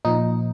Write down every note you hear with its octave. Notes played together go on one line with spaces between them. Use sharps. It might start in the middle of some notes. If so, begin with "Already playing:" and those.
A#2 F3 D#4